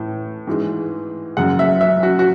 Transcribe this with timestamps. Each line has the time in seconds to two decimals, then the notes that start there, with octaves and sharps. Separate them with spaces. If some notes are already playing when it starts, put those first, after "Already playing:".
Already playing: A2 E3
0.47 G#2 E3 G#3
1.37 F#2 C#3 G#3 F#5
1.59 E5
1.81 E5
2.03 F#4
2.19 F#4